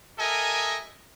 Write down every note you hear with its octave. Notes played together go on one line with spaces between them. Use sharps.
G4 A4 A#4 D#5 E5 G#5